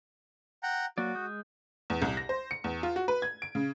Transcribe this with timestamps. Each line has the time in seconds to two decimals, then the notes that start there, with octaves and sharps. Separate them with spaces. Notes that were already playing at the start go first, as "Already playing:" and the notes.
0.63 F#5 G5 A#5
0.98 F#3 A#3 F#4 D5
1.15 G#3 D#6 G6
1.90 E2
2.02 C2
2.17 A#6
2.29 C5
2.51 C#7
2.64 E2
2.83 F4
2.96 F#4
3.08 B4
3.22 G#6
3.42 D7
3.55 C#3